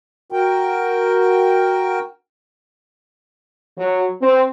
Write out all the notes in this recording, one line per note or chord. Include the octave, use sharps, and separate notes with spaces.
F#4 A#4 G5
F#3
C4